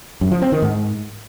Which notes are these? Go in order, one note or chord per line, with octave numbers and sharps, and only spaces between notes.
F#2
F3
C4
D#3
G#2